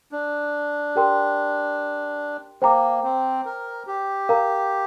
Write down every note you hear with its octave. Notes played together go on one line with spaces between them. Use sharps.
D4
G4 A#4 G5 C6
A#3 C5 G5 A#5 D6
C4
A#4
G4
A#4 F5 A#5